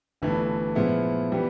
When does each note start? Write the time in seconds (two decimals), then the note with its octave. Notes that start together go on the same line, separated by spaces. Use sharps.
0.22 G1 G2 E3 A3
0.75 A#2 F3 G#3 B3 E4
1.32 E3 G3 B3